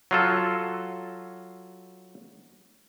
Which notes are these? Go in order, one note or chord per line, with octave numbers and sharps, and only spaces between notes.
F#3 F4 A4